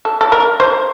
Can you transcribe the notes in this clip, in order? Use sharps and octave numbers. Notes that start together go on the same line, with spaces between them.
A4
A4
A#4
C5